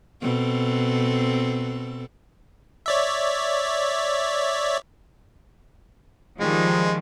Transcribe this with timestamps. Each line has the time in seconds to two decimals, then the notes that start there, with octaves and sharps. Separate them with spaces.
0.22 B2 C4 A4
2.86 C#5 D5 E5
6.40 D#3 F3 G3 G#3